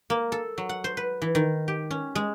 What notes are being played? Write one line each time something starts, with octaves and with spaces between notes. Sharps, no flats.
A#3
A4
F#3
F#5
C5
B4
E3
D#3
G4
C#4
G#3